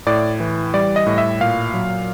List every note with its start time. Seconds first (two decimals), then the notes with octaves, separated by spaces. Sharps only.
0.07 A2 D5
0.40 E3
0.74 G3 D5
0.96 D#5
1.06 A2
1.18 E5
1.41 A#2 F5
1.74 F#3